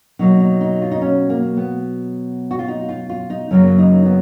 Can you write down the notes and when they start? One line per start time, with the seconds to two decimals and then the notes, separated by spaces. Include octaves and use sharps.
0.19 B2 F#3 A#3 D#4
0.40 D#4
0.61 D#4
0.82 F4
0.91 D#4
1.02 C#4
1.30 A#3
1.57 B3
2.51 F#4
2.59 F4
2.68 D#4
2.89 F4
3.09 F4
3.30 D#4
3.51 F#2 C#3 F#3 A#3 C#4
3.78 D#4
4.05 B3